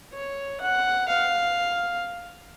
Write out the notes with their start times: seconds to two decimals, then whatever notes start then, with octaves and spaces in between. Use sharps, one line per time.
0.13 C#5
0.61 F#5
1.08 F5